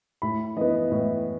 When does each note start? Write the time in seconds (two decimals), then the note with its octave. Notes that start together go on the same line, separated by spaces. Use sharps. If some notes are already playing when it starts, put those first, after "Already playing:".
0.22 A2 B5
0.57 E3 B3 D#5
0.91 A2 B4